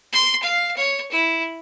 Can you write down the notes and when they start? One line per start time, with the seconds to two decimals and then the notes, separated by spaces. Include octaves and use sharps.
0.13 C6
0.43 F5
0.77 C#5
1.11 E4